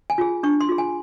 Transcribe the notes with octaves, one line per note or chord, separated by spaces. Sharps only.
G#5
F4 G#4
D4 C#6
C6
F4 G#4
G#5